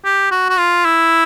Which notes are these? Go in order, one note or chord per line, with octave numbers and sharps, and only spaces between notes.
G4
F#4
F#4
F4
E4